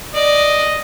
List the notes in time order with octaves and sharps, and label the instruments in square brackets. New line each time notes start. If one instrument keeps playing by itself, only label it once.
[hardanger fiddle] D5 [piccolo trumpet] D#5